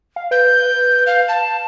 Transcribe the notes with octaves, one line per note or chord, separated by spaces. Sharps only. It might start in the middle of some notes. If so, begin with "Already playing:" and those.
F5
B4 G6
F5
A5